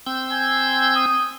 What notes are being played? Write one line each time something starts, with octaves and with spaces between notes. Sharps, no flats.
C4 E6 G6
G#5
D#6